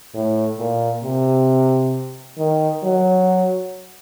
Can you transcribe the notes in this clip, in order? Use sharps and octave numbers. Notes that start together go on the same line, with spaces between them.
A2
A#2
C3
D#3
F#3